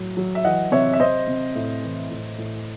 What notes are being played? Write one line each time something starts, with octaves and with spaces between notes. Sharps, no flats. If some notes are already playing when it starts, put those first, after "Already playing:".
Already playing: A2 F#3
F#3
E5
E3 D#5 F#5
C3 C#5 E5
E5
C3 C5 D#5
C3
A2
E3
A2
A2